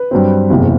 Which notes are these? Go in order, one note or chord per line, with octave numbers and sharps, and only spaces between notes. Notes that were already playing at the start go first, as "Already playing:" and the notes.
Already playing: B4
G2 F#3 C4
F#1 E2 C3